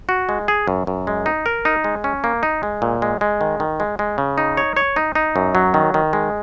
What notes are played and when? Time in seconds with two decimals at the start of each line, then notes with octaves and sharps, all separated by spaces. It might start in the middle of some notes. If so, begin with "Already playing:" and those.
0.09 F#4
0.29 G#3
0.48 G#4
0.68 F#2
0.87 F#2
1.07 G#3
1.26 D#4
1.46 A#4
1.65 D#4
1.84 G#3
2.04 C#4
2.24 A#3
2.43 D#4
2.63 G#3
2.82 A#2
3.02 G#3
3.21 G#3
3.41 D#3
3.60 D#3
3.80 G#3
3.99 G#3
4.18 C#3
4.38 D#4
4.57 C#5
4.77 C#5
4.96 D#4
5.15 D#4
5.36 F#2
5.55 F#3
5.74 D#3
5.94 D#3
6.13 G#3